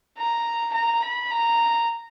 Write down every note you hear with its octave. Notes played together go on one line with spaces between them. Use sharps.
A#5
A#5
B5
A#5